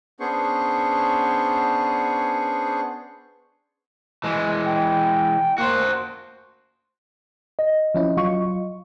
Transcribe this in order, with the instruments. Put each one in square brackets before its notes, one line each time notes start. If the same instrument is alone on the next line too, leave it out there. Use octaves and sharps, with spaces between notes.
[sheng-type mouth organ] B3 C#4 D4 G#4 C5 C#6
[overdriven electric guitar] E3 G#3
[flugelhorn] G5
[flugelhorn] A#3 [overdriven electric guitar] F#4 C5
[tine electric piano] D#5
[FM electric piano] F3 C#4 E4
F#3 F4 C#6